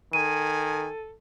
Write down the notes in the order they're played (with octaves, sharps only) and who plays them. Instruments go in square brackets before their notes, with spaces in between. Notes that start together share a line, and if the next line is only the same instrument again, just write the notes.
[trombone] D#3 [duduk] A4 [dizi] G#5 [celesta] D#7